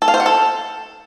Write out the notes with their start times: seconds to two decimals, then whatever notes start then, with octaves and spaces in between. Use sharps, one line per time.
0.02 A4
0.08 F5
0.14 C5
0.20 F#5
0.26 A4